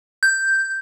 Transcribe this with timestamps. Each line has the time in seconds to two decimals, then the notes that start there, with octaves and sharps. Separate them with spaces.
0.23 G6